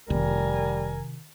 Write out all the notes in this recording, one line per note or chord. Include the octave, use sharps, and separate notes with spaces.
F1 C3 D#3 G3 A#4 G#5